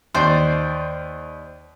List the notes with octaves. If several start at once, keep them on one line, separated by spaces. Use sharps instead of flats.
D#2 C5 D5